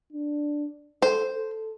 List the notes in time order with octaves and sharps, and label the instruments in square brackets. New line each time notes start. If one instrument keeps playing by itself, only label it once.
[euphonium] D4
[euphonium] A4 [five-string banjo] C5
[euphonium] A4